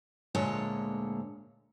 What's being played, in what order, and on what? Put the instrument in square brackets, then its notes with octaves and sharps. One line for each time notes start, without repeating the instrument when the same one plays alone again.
[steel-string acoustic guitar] D2 A#2 D3 G#3 C#5 A5